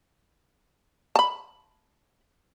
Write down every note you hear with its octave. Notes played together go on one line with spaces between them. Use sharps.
A5 B5